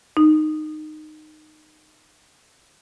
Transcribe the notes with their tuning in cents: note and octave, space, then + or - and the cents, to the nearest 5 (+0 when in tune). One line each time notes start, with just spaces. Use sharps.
D#4 -15